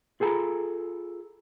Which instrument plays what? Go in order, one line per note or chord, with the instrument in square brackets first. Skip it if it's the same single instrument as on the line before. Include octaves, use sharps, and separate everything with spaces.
[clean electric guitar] F4 G#4 A4 G#5 A#5 B5